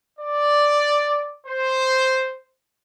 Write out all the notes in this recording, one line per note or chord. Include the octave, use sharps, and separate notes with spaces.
D5
C5